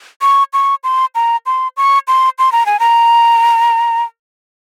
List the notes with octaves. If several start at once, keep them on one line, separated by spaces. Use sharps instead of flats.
C#6
C#6
C6
A#5
C6
C#6
C6
C6
A#5
G#5
A#5